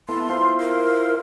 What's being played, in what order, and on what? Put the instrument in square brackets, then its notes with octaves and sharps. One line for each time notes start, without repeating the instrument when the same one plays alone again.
[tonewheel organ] B3 E4 A4 [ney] C6
[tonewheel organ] E4 F4 C5
[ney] A#4